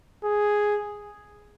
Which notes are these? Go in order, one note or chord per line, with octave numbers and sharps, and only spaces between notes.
G#4